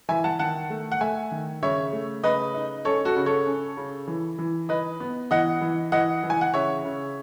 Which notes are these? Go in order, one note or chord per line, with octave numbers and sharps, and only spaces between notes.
E3 E5 G#5
F#5 A5
D#3 F#5 A5
A3
F#5
A3 E5 G#5
D#3
C#3 C#5 E5
A3
C#3 B4 D#5
D#4
C#4 A4 C#5
F#4 A4
C#3
A4 C#5
C#4
C#3
E3
E3
D#4 B4 D#5
B3
E3 D#5 F#5
E3
E3 D#5 F#5
E3
G#5
F#5
C#3 C#5 E5
C#3